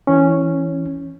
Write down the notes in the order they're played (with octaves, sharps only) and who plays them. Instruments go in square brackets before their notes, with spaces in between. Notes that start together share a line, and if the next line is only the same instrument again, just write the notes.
[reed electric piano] E3 C#4